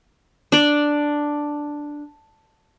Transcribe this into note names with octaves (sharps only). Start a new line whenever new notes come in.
D4 D5